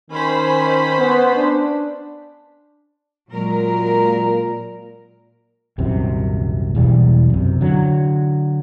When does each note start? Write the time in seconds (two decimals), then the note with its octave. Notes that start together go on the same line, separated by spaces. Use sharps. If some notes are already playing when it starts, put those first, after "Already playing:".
0.10 D#3 C#4 C5 B5
0.98 B3
1.36 D4
3.31 A#2 F#3 G#3 A#4
5.78 D#1 C2 F#2 C3
6.75 E1 B1 E2 G3
7.30 F#2 C3
7.61 D3 F#3